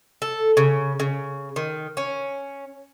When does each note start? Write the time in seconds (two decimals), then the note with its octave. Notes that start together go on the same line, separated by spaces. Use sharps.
0.22 A4
0.57 C#3
1.00 C#3
1.56 D#3
1.97 C#4